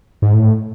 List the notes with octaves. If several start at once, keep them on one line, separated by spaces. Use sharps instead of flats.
G#2
A2